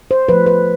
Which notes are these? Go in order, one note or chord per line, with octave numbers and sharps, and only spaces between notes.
C5
F3 A3 B4
B4